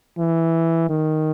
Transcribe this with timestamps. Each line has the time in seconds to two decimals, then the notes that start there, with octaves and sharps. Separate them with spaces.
0.18 E3
0.89 D#3